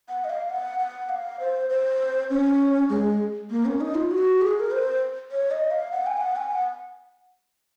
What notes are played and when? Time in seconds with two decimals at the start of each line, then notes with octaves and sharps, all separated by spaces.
0.09 F#5
0.24 D#5
0.30 F5
0.50 F#5
0.79 F#5
1.09 F5
1.40 C5
1.70 C5
2.30 C#4
2.90 G#3
3.51 A#3
3.65 C#4
3.81 D#4
3.95 F4
4.11 F#4
4.41 G#4
4.60 A#4
4.71 C5
5.31 C#5
5.51 D#5
5.71 F5
5.92 F#5
6.07 G#5
6.17 F5
6.21 F#5
6.36 G#5
6.51 F#5